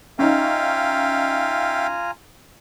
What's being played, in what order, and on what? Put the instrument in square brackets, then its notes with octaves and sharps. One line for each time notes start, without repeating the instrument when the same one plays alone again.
[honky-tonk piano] C#4 D#4 [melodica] F4 G#5 A#5 [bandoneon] E5 F5 G5